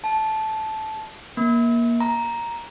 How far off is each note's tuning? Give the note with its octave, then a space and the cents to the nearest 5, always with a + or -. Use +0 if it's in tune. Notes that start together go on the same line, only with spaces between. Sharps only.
A5 -10
A#3 +20
A#5 +5